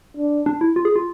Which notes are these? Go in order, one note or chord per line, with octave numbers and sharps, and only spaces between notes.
D4
D4
E4
F4
G#4
F4